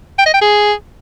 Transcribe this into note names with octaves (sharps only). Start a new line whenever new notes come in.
G5
D#5
G5
G#4